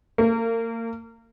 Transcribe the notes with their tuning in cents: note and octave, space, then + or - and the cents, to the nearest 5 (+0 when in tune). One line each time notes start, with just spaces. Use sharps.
A#3 -35